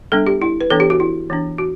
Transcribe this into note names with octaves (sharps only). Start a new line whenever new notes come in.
G3 B3 D4 A4
G4
E4
B4
E3 B3 D4 A4
G4
F#4
E4
E3 B3 D4
F#4